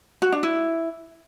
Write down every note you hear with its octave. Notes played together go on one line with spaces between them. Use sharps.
F#4
D4
E4